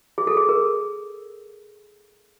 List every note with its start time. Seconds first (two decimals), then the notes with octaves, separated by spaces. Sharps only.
0.18 G#4
0.27 A4
0.37 G#4
0.49 A#4